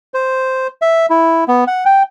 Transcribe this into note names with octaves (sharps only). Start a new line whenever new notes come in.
C5
E5
E4
B3
F#5
G5